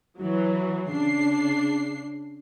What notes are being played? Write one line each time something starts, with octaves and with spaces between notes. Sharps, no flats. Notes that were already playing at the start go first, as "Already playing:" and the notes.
E3 F#3
C#3 D4 C7